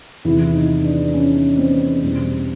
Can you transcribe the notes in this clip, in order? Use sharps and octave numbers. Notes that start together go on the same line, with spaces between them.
E2 C3 D#3 E4
D#4
D4
C#4
C4
E2 B2 G3 C4